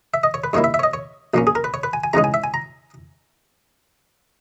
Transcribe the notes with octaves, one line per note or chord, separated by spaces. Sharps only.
E5
D#5
C#5
B4
G2 D#3 A#3 E4 C#5
E5
E5
C#5
D#5
C#5
A#1 A#2 A#3 C#4
G#4
A#4
B4
C#5
B4
G#5
G#5
E2 C#3 G#3 D#4 A#5
G#5
E5
G#5
A#5